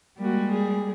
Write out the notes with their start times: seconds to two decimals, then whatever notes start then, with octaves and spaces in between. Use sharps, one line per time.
0.19 G3 G#3 A#3 F#4
0.51 G#4